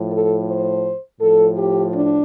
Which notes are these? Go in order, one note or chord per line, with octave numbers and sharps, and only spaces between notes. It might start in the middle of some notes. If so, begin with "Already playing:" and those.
Already playing: A2 F3
A4
C5
A2 F3 A4
G4
D4